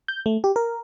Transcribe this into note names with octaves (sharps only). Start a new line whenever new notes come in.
G6
A3
G4
A#4